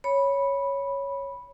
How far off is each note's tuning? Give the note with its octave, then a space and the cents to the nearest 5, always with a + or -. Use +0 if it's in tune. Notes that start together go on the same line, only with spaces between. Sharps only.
C#5 +0 B5 -10